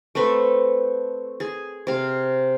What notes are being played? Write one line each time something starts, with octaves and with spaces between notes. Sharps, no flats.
A3 C4 B4
G#4
C3 F5